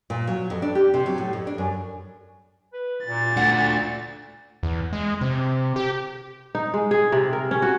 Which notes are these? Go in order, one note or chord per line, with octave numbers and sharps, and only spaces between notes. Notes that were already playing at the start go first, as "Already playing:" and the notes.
A#2
F#3
F2
D4
G4
C3
F#3
A2
F2
D4
F#2
B4
A#2 A6
A3 D4 F#5
E2
G#3
C3
G4
D#4
G#3
G#4
C3
A#4
C#4
F#4